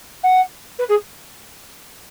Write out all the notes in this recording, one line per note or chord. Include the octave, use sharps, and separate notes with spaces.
F#5
B4
G#4